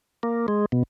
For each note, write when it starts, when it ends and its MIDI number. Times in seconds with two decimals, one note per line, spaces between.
0.23 0.46 58
0.48 0.66 56
0.72 0.83 47